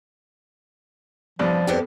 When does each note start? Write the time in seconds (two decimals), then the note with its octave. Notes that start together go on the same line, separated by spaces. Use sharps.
1.39 E2 G2 C3 F3 D5
1.67 F2 B3 G4